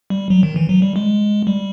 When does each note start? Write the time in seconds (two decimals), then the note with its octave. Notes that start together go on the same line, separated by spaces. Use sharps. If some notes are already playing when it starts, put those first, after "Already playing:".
0.10 G3
0.30 F#3
0.43 D#3
0.56 E3
0.69 F#3
0.82 G3
0.96 G#3
1.47 G3